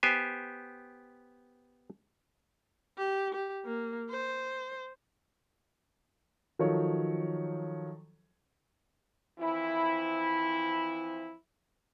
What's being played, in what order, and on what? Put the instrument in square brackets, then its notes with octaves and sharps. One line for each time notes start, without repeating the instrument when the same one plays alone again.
[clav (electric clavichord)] B3 G4 C5 G#5
[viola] G4
G4
A#3
C5
[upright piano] D#3 F3 F#3 A4 C#5
[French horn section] E3 F3 C4 E4